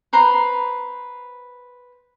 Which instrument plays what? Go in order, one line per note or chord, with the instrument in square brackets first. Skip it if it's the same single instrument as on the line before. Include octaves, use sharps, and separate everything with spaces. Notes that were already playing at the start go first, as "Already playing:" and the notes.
[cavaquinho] B4 C5 A#5 C6